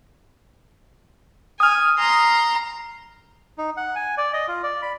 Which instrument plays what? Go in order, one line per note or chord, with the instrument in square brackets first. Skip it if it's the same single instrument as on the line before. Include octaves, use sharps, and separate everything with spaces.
[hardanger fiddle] G#5 [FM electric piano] D#6 F6
[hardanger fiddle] A#5 C6
[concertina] D#4
F#5
G#5
D5
D#5
F4
D5
B5